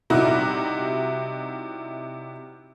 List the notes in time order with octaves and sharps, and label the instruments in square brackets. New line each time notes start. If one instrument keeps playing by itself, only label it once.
[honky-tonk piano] C3 G3 D#4 E4 F#4